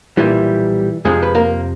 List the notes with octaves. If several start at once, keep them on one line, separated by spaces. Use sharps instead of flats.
B1 A#2 E3 G3 E4
F2 C3 F3 G#3 G#4
B4
A#3 A#4